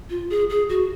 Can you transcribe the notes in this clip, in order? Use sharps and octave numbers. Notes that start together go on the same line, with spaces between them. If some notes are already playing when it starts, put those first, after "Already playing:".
F4
G#4
G#4
F#4